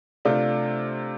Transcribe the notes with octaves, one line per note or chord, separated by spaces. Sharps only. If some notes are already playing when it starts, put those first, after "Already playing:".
C3 A3 D4 F4